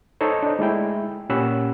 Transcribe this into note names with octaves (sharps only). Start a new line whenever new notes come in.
D#4 A4 C5 C#5
D4 D#4
G#3 A3 E4 G5
A#2 C#4 G4 F#5 B5 E6